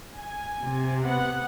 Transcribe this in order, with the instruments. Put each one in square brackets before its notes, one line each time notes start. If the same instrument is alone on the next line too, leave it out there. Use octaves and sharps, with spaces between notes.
[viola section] G#5
[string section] C3
[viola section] B3 F#5